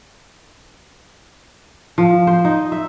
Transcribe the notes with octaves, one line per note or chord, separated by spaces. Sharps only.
F3
C5
D#4
E5